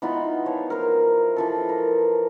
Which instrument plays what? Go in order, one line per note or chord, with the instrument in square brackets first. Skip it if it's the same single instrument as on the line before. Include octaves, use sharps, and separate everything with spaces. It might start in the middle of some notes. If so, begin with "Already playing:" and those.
[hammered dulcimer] E3 B3 D#4 F4
F3 C#5
A#4 C5
E3 F3 A4
A#4